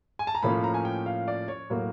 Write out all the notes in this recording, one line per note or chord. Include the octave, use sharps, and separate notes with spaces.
G#5
A5
A#5
A2 F3 A#3 C#4 B5
A#5
G#5
G5
F5
D5
C#5
A2 F#3 A#3